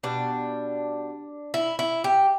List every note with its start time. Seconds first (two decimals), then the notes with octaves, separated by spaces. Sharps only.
0.03 B2 G3 D4
1.54 E4
1.79 E4
2.04 G4